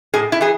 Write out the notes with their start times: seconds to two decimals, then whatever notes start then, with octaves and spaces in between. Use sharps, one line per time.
0.14 A2 G#4
0.32 E4
0.41 E3 G#4